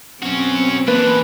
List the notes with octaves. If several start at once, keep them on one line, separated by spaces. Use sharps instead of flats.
F#2 B2 C4 C#4 F#4
E3 A#3 D4 B4